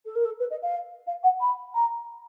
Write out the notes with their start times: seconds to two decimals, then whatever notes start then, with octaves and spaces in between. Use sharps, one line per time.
0.05 A4
0.15 A#4
0.25 A4
0.39 B4
0.50 D#5
0.62 F5
1.07 F5
1.23 F#5
1.40 B5
1.74 A#5